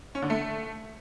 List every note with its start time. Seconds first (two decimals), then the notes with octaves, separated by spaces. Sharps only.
0.15 C#4
0.22 D3
0.30 A3